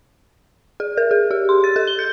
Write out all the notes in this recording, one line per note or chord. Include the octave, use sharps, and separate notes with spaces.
G#4
A#4
G#4
G4
C6
A6
A4
G7
G6